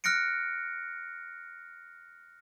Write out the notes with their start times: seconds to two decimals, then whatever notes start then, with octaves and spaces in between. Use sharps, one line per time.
0.04 F6 F#6 A#6 C#7 D7